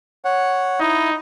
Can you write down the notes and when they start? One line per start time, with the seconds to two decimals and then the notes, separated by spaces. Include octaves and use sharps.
0.25 C#5 F#5
0.80 D#4 E4 D#5